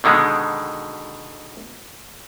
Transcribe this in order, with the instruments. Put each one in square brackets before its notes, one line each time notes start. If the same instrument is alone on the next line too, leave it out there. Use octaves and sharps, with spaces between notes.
[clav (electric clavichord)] B2 D3 D#3 G#3